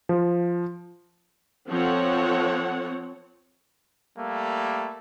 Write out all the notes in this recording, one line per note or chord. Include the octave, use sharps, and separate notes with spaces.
F3
F3 C4 A4 C#5 F#5
G3 A3 A#3